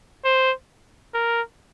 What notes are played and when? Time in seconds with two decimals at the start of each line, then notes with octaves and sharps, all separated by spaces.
0.24 C5
1.14 A#4